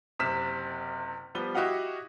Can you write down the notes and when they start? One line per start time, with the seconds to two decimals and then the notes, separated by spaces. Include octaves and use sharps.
0.19 F#1 C3 F6 B6 E7
1.35 F3 G3 B3 G7
1.55 E4 F#4 G4 D#5 F5 F#5